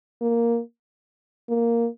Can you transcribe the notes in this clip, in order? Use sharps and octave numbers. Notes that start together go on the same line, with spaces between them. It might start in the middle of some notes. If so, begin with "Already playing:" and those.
A#3
A#3